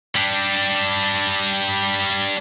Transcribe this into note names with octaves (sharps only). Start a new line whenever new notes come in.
G3 D4